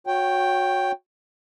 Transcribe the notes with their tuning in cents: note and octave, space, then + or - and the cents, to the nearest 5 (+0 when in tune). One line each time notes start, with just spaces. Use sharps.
F#4 -25 C#5 +0 G5 +0